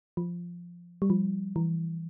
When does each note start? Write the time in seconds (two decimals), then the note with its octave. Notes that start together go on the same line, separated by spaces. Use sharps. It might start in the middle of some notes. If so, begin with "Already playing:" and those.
0.17 F3
1.02 G3
1.10 F3
1.56 E3